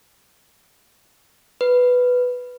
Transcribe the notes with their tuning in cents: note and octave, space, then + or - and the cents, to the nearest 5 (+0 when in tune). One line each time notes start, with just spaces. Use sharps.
B4 +5